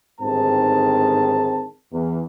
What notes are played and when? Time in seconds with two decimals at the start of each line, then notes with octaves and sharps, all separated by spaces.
0.20 G1 G#2 D#3 C4 G#4 A5
1.93 E2